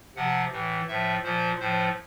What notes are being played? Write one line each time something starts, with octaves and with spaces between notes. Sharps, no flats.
C3 F3 F#5
A2 E3
A2 F3 E5
A#2 F3 C5
A2 F3 C5